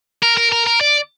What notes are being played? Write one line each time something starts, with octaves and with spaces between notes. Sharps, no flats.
A#4
A#4
A#4
A#4
D5